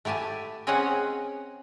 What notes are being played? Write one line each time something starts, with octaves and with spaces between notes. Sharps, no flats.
A3 E4 G4 G#5 A5
C4 C#4 G#4 C#5 D#5 F#5